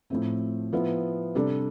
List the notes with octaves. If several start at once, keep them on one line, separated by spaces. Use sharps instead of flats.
A2 F3 A3 C4
F3 B3 E4
C3 G3 D4 A4 D5